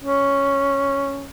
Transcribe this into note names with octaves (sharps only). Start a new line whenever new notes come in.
C#4